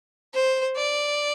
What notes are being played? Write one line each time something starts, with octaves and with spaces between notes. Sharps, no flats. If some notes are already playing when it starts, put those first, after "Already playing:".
C5
D5